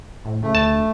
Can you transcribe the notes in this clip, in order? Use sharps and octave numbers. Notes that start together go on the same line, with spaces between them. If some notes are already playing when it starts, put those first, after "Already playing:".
A2
C#3 A3
D2 A5